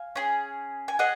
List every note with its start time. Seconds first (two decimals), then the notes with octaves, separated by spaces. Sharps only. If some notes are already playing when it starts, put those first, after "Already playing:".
Already playing: F5 G#5
0.16 C#4 G#4
0.88 G#5
0.99 G#4 D#5 F#5